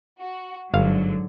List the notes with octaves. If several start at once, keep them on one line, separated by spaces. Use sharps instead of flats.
F#4
G1 G#2 D3 F#3 F5